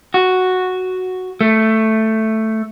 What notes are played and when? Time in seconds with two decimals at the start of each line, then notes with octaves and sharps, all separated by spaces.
0.14 F#4
1.41 A3